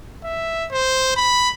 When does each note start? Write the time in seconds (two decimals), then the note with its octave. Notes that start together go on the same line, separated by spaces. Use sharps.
0.24 E5
0.71 C5
1.16 B5